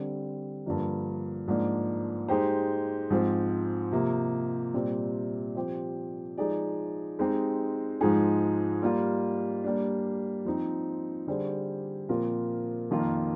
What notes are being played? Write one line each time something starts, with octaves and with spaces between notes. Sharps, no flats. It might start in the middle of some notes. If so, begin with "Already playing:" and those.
Already playing: D3 G3 C4
G2 D3 F3 A#3
G#2 F3 A#3 D4
G#3 D#4 G4 C5
G#2 F3 C4
C3 F3 A#3
A#2 G3 C4
F3 C4 G4 C5
F3 G#3 D#4 G#4 D5
G#3 C4 D#4 G4
G#2 F3 G#3 D#4 G#4
G3 A#3 F4
G3 A#3 D4
F3 C4 D#4
D3 G3 D4 G#4 C5
A#2 F3 C4 F4 A#4
F2 D#3 A#3 F4